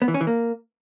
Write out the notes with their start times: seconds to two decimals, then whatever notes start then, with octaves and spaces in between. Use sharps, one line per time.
0.02 B3
0.08 E3
0.14 C#4
0.21 E3
0.27 A#3